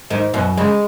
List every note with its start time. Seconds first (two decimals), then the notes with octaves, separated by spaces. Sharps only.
0.10 G#2 D#3
0.34 F#2 B2
0.57 C#3 G#3